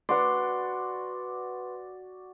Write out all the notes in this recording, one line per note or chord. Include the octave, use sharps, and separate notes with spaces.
F#4 B4 D5 C6